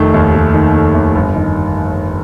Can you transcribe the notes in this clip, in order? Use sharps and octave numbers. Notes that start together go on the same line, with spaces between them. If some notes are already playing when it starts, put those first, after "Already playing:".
Already playing: F1 D#3 A3
D#2
F1
D#3
A3
D#2
G1
D#3